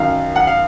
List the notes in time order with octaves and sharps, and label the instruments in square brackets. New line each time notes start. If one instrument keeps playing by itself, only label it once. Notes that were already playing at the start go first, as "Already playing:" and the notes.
Already playing: [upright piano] F#2 D#3 F5
F#5
F5